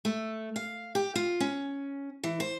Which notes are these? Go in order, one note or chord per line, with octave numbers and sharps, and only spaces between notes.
A3
F5
G4
F4
C#4
E3
C5